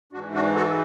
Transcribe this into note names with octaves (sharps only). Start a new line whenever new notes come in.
G#2 E3 D4 F#4
D4 F#4
F#4 A4